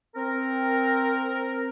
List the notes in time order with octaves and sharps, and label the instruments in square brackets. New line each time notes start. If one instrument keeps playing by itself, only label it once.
[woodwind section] C4 A#4